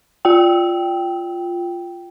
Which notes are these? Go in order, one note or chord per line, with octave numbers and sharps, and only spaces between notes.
F4 G5